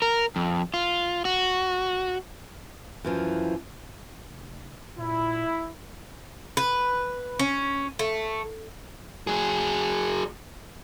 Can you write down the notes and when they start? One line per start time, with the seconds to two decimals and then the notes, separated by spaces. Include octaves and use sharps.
0.02 A#4
0.36 F2
0.74 F4
1.25 F#4
3.04 F#2 E3 F3
4.30 F1
4.98 A#2 E4
6.57 B4
7.39 C#4
7.99 A3
9.27 F#3 G#4